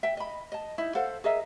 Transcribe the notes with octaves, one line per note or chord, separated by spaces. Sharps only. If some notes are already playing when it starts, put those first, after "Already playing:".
E5 G5
D#5 B5
D#5 A5
D#4 E4
A4 C5 F5 F#5
G#4 A#4 D#5 E5